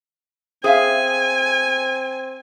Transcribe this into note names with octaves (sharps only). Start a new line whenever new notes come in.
C4 G#4 E5 F5 G#5